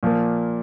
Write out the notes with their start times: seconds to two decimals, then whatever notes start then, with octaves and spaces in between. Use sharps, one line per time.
0.03 A#2 F3 A#3